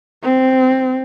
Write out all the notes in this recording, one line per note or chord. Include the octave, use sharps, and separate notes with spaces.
C4